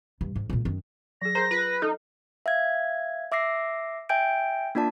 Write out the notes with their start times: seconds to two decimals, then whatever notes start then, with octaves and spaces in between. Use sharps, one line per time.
0.21 G2
0.36 G#2
0.50 A#2 G#3
0.65 F#2 D#3
1.22 F#3 G#4 A#6
1.35 G#4 A#4 C5 A#5
1.51 F4 B4
1.82 D#4 A4
2.46 E5 F5 G#6
3.32 E5 D6 E6 A#6 C7
4.09 E5 G5 G#5 G6 D7
4.75 A#3 D4 F4 D5 A5